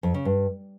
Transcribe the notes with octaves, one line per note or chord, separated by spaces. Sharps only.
F2
C#3
G2